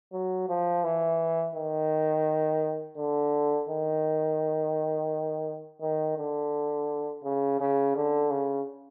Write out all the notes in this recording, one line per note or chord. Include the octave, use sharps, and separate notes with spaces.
F#3
F3
E3
D#3
D3
D#3
D#3
D3
C#3
C#3
D3
C#3